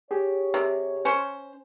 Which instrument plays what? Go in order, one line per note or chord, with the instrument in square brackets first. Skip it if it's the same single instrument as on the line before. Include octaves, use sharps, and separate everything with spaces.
[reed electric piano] G4 G#4 [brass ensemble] C#5
[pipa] C3
C#4 C5